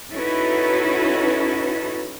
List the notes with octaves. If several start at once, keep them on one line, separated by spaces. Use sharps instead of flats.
C#4 D#4 E4 F#4 A4 B4